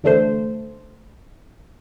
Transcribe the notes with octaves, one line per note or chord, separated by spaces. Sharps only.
E2 D3 A3 C5